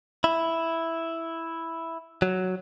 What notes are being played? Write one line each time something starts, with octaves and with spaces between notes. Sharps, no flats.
E4
F#3